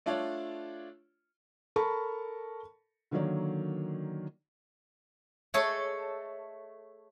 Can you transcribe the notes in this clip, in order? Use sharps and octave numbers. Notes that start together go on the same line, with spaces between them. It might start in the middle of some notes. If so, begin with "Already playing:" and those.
A3 D4 F4 C#5 D5
A4 A#4 A5 B5 C#6
D3 D#3 F#3 A#3 C#5 D5
A3 G#4 A4 C#5 D#5